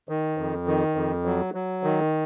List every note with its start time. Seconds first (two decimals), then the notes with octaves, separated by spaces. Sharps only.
0.09 D#3
0.38 F2
0.67 D#3
0.95 F2
1.25 F#3
1.54 F#3
1.83 D#3